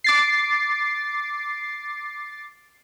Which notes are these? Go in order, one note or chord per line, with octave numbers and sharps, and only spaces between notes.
D6 A6 C7